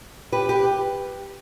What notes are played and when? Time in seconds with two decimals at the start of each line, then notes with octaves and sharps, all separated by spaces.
0.32 G4 B4
0.49 G4 B4